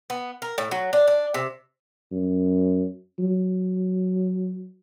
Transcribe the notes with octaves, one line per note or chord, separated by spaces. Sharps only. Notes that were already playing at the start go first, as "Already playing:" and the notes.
B3
A#4
A2
F#3
D4
D4
C3
F#2
F#3